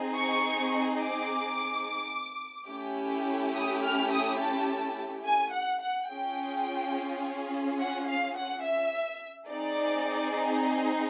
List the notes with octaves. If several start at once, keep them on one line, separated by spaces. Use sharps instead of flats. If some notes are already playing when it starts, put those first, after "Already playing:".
Already playing: C4 D#4 G#4
C#6
D6
A3 C#4 E4 G4
D#6
F6
D#6
A5
G#5
F#5
F#5
C#4 F4 G#4 G5
F#5
F5
F#5
E5
C4 D#4 G#4 D5